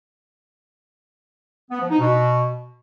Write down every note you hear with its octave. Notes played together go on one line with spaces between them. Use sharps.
B3
F3
D#4
B2